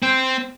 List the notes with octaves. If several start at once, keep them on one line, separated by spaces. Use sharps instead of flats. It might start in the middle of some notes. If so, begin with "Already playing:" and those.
C4